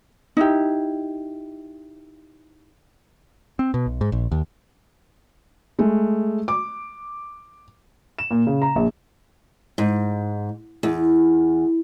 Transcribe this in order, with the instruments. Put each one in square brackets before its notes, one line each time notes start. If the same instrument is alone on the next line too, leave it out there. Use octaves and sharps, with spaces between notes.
[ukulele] D#4 E4 G4
[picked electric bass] C4
B2
B1
G#2
A#1
D#2
[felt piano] G#3 A3
D6
[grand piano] E7
A#2
C#3
A#5
A#1
[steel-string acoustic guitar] G#2
E2